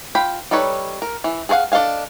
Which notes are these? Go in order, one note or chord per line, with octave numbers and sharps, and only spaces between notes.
F4 G5 B5
G3 D#4 A4 B4 C#5
A#4
E3
G#4 A4 C#5 F5 F#5
D4 A4 D#5 F5 G#5